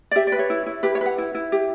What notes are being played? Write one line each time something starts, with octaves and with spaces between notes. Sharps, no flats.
D5
G4 E5
D5
B4
C#5
E4
E4
G4 B4
C#5
B4 F#5
E4
E4
G4